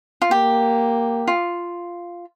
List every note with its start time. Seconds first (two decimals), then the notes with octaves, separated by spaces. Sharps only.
0.22 F4
0.31 A#3 G4
1.28 F4